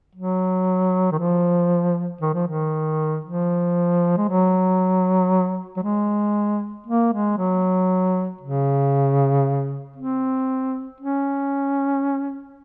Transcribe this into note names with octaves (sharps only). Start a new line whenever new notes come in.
F#3
D#3
F3
D#3
F3
D#3
F3
G#3
F#3
F#3
G#3
A#3
G#3
F#3
C#3
C4
C#4